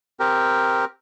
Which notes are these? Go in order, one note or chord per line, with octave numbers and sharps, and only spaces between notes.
C4 G4 A#4